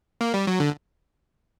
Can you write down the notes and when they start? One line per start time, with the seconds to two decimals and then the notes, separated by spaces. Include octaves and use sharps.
0.21 A#3
0.34 G3
0.47 F#3
0.60 D3